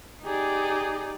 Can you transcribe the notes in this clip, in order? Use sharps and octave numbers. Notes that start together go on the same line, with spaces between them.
D#4 G4 G#4 D5